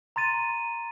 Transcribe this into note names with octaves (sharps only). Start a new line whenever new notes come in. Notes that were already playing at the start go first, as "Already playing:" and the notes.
A#5 C6 A6 D#7